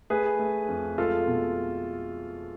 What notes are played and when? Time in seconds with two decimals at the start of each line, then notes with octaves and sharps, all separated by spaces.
0.10 A3 G#4 B4
0.39 A3
0.68 F2
0.98 G#3 F4 A4
1.27 B2